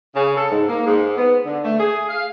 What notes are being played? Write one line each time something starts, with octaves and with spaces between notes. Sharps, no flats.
C#3
A4
G#2
A#3
G#2
B3
D3
A3
G#4
F5